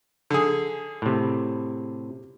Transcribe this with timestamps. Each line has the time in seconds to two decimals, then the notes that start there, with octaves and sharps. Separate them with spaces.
0.30 D3 G#4
1.02 A2 C3